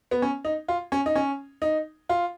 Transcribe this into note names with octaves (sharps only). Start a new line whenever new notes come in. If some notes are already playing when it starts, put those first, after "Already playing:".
B3
C#4
D#4
F4
C#4
D#4
C#4
D#4
F4